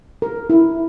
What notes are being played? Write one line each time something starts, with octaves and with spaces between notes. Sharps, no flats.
A#4
E4